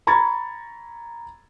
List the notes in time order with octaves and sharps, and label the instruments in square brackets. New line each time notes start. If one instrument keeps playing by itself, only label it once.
[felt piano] A#5 B5 C#6 G#6 A6